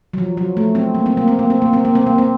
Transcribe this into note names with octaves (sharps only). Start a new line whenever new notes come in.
F#3
F3
F#3
A3
C4
A#3
C4
A#3
C4
A#3
C4
A#3
C4
A#3
C4
A#3
C4